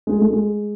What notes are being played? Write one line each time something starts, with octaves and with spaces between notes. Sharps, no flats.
G#3
A3
G#3